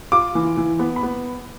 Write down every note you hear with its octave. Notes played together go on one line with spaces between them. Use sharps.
F4 D6
E3
E3
B3
B5
B3